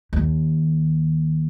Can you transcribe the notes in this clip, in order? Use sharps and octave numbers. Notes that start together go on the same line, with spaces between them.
D#2